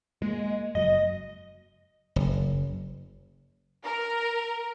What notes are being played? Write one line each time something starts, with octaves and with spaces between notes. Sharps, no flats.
G#3 A#3
F#1 F#3 D#5
F#1
A#4